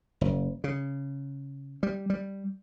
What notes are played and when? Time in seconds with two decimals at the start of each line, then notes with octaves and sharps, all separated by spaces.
0.21 F#1
0.64 C#3
1.83 G3
2.10 G3